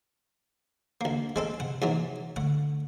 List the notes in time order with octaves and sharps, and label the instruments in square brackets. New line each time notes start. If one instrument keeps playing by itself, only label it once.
[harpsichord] D2 A#3
[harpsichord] G#3 C4 A4 [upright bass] B3
[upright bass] C3 [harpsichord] F#5
[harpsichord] G#2 E3 F#3
[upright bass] D3 A3 [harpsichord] F#5